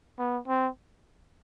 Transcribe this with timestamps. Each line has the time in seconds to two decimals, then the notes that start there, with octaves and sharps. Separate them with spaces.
0.19 B3
0.48 C4